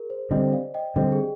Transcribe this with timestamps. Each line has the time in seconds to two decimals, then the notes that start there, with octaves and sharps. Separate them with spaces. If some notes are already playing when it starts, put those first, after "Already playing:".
Already playing: G#4 A#4
0.10 C5
0.31 D3 G3 C4 C5 D#5
0.52 D5 F5
0.74 D#5 G5
0.96 D3 G3 C4 D#5 G5
1.12 G#4